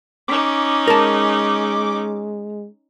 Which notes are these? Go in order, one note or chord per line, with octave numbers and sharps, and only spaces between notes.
C#4 D#4 D6
G#3 A#4 A5